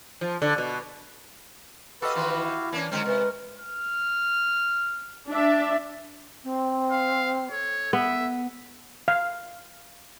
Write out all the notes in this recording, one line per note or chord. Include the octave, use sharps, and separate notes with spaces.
F3
D3
B2
F#4 G4 A4 B4 D#5 F5 E6
D#3 E3 C6
E4
E3 A#3 C#4 D4
D3 F#3 G#3 C4 A#4
C3 B4
F6
D4 D5 E5
C4
F5
A4 C#5
B3 E5
F5